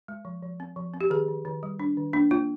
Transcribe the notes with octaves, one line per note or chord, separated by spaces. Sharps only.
G#3
F3
F3
C4
F3
C4
G4
D#3 G#4
D#3
D#3
G3
D4
D#3
A#3 D4
A#3 F4